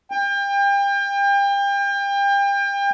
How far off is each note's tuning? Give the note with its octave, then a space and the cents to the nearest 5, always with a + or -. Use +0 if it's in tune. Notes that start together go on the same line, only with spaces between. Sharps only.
G5 +35